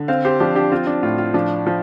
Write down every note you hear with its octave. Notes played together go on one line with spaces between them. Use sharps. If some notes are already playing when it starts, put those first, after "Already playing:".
Already playing: D3
C4 C5 F5
G4 C5
F3 D4 G4
D4 G4
C4 F4
D4
A2 F4
F4
F3 D4
F3